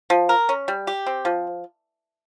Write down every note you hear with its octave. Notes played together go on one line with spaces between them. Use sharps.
F3
A#4
C#4
G3
G4
C4
F3